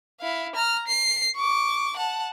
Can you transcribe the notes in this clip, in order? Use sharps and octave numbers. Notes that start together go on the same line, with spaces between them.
E4 F5
A#5 F6
C7
C#6 D6
F#5 A5